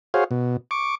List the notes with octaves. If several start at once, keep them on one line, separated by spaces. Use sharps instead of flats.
F#4 G#4 C5 C#5 F5
B2
C#6 D6